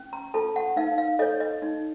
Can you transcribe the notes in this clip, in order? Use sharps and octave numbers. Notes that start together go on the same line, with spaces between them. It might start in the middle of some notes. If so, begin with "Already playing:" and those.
Already playing: C#4
A#5
F4 A4 A5
F#5
D#4 F5
F5
A4 C#5 D#5
D#5
D#4